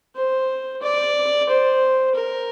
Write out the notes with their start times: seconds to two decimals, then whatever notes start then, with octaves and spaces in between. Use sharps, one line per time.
0.16 C5
0.82 D5
1.49 C5
2.15 A#4